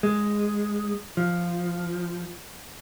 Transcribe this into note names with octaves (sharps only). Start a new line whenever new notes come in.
G#3
F3